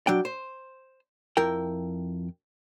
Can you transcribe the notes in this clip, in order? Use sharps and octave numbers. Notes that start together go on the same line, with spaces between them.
F#3 D4 G5
C5
F2 E4 A#4 G5